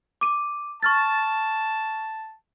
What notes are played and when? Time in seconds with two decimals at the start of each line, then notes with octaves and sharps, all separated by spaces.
0.21 D6 D#7
0.83 A5 C#6 F6 A6